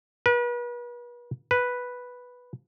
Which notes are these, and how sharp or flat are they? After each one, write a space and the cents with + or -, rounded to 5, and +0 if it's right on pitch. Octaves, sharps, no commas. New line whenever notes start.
B4 -40
B4 -5